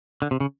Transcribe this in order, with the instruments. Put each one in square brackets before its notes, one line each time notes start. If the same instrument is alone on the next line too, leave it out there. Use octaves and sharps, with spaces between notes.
[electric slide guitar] D3
C3
C#3